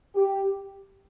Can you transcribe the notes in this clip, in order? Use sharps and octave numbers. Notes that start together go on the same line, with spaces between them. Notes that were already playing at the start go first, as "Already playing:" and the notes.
G4